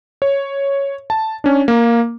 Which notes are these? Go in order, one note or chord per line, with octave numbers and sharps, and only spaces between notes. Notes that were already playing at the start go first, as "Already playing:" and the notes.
C#5
A5
C#4 D4
A#3